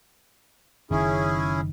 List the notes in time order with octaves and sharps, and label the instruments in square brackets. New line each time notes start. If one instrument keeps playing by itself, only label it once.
[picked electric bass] F#1 D#3 [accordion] C#4 E4 G#4